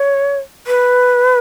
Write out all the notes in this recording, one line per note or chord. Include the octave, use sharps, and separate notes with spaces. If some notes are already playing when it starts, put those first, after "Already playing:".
Already playing: C#5
B4